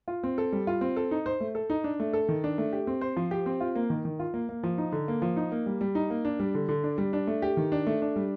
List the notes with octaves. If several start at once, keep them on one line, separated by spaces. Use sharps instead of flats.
F4
C4
A4
G3
F4
C4
A4
D#4
C5
A3
A4
D#4
D4
A3
A4
D#3
D4
A3
G4
C4
C5
F3
G4
C4
F4
A#3
D#3
D#3
F4
A#3
A#3
F3
D#4
D3
A#3
F3
D#4
A#3
G3
G3
D#4
A#3
D4
G3
D3
D3
D4
G3
D4
A3
G4
D#3
D4
A3
D4
G3